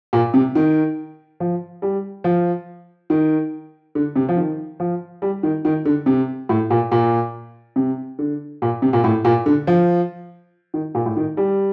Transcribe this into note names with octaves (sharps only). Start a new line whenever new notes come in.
A#2
C3
D#3
F3
G3
F3
D#3
D3
C3
F3
D#3
F3
G3
D#3
D#3
D3
C3
A2
A#2
A#2
C3
D3
A#2
C3
A#2
A2
A#2
D3
F3
D#3
A#2
A2
D#3
G3